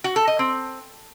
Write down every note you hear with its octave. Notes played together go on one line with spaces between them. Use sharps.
F#4
A4
D#5
C4